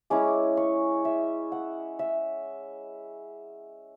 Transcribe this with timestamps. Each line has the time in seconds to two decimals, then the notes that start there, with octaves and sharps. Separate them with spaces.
0.10 G#3 C#4 E4 D6
0.57 C#6
1.05 E5
1.52 F#5
1.99 E5